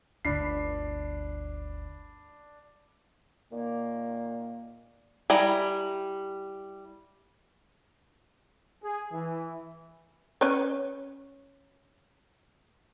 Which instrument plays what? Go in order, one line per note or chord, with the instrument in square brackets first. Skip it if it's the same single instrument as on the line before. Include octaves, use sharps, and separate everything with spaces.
[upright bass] G1 D2 [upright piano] D4 B5 C7
[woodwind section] A#2 D#3 A#3
[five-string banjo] G3 E4 G#5 A#5
[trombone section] G#4
E3
[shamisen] C#4 B4 C#5